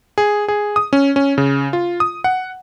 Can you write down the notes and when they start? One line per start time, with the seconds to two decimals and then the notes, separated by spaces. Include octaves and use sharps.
0.18 G#4
0.48 G#4
0.76 D#6
0.93 C#4
1.16 C#4
1.38 C#3
1.73 F4
2.00 D#6
2.24 F#5